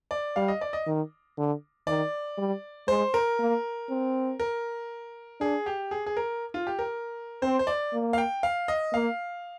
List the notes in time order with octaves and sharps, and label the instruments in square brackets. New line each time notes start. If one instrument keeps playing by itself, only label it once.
[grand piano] D5
[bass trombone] G3 [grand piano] F5
[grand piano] D#5
D5
D#5
[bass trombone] D#3
D3
[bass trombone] D#3 [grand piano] D5
[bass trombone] G3
[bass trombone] G#3 [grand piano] C5
[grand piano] A#4
[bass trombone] A#3
C4
[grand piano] A#4
[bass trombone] D4 [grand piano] G#4
[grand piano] G4
G#4
G#4
A#4
F4
G4
A#4
[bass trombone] C4 [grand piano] C5
[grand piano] C5
D5
[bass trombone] A#3
[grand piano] F5
G5
F5
D#5
[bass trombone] A#3 [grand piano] F5